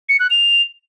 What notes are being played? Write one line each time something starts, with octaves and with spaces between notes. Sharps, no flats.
C#7
F#6
F7